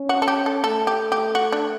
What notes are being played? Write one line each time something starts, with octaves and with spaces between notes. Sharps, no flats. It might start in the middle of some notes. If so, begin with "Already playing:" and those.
Already playing: C#4
F#4
A4
G4
A4
A3 A4
G4
G4
F#4
D4